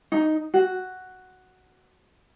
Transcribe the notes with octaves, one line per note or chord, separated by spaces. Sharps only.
D#4
F#4